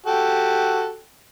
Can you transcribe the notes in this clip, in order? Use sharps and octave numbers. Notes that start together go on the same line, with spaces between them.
F#4 G4 A4